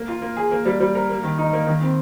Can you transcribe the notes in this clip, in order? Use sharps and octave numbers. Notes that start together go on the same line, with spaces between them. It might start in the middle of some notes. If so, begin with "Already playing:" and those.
Already playing: A#3
F4
A#3
G#4
A#3
G3
G3
A#4
A#3
D#3
D#4
A#3
D#3
C4